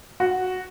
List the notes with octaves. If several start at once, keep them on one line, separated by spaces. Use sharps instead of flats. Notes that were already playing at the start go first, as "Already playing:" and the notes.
F#4